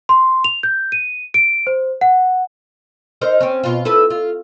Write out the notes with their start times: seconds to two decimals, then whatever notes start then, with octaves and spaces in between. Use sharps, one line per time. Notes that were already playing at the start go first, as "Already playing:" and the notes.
0.09 C6
0.44 F7
0.63 G6
0.92 D#7
1.34 D7
1.67 C5
2.01 F#5
3.21 D#4 A#4 C5
3.41 C4 C#4
3.64 B2 F4
3.85 E4 A4 B4
4.10 F4